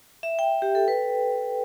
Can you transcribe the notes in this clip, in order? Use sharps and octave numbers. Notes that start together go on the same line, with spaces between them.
E5
G5
G4
A4
B4